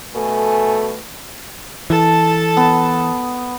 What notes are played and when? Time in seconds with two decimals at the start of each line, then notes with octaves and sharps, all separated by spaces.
0.15 B2 A3 A4 G#5
1.90 E3 A4 A5
2.57 B3